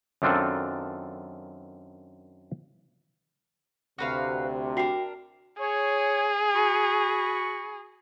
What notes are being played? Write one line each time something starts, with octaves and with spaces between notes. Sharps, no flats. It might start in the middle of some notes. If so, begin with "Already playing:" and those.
F#2 D#3 C4 D4 F4 A4
D2 C3 F#4 B4 F5
D4 F#4 A#4 G5 C7
G#4 C#5
F#4 B5 C#6